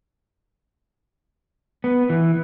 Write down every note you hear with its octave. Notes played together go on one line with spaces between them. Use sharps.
B3
E3